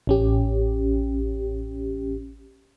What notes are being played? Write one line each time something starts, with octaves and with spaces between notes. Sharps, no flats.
A1 C#4 G4